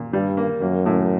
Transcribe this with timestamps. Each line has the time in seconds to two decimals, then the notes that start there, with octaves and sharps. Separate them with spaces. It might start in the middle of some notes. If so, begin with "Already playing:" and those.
Already playing: A#2
0.13 G2 G3
0.37 A#3
0.62 F#2 A#3
0.86 A2